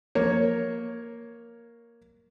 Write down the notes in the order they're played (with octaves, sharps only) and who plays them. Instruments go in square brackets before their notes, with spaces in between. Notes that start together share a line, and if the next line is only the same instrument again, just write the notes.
[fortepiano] A#3 C#5